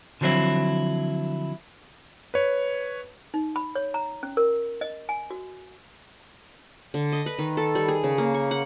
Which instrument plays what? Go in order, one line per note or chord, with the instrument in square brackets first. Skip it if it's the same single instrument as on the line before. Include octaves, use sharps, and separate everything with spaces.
[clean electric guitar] D3 F3 F#3 C4 E4
[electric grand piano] B4 C#5
[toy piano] D#4
B5
C#5
A#5
C#4
A#4
D#5
G#5
F#4
[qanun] D3
D#5
B4
D#3
A4
G3
G#4
C#3
A#3
C#6
F#5